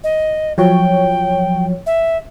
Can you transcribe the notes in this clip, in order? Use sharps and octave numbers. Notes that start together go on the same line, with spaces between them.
D#5
F3 F#3 C#5 G5
E5